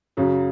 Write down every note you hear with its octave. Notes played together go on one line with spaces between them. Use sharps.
F#2 C#3 F#3